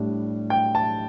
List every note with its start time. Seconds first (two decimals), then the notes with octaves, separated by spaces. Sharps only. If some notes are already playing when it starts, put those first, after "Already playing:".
Already playing: A2 G3 D4
0.50 G5
0.75 A5